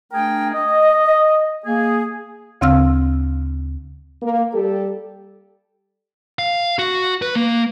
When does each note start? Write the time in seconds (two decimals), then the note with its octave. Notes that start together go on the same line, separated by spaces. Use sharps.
0.12 A3 D4 G#4 A#4 G5
0.54 D#5
1.65 A#3 G#4
2.61 D2 C#3 C4 F5 E6 F6
4.21 A#3
4.54 G3 G4 A4
6.39 F5
6.79 F#4
7.22 B4
7.36 A#3